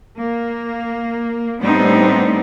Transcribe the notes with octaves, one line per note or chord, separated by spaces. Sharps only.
A#3
A2 G3 B3 C4 D4 D#4